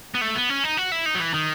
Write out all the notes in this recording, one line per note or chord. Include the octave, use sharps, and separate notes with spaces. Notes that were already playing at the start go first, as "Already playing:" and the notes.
B3
A3
B3
C#4
D#4
F#4
E4
D#4
F#3
E3
D#3